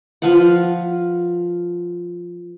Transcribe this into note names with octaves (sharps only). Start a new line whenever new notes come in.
F3 B4 F5 F#5